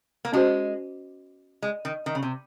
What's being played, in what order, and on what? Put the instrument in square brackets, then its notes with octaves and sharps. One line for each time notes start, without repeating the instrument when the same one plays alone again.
[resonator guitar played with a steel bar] A#3
[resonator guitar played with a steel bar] G#3 [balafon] C#4 F#4 C5
[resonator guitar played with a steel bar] G#3
D#3
D#3
C#3
C3